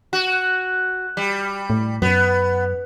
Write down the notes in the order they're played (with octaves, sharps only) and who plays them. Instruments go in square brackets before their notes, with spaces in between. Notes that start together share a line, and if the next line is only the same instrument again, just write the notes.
[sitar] F#4
G3
[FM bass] A2
[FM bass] F#2 [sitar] B3